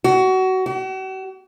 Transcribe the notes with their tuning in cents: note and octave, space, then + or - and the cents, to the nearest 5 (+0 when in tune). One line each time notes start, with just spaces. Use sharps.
F#4 +20
F#4 +45